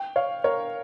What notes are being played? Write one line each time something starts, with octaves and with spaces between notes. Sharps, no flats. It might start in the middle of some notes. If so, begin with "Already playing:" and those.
Already playing: G5
C#5 F5
A#4 C#5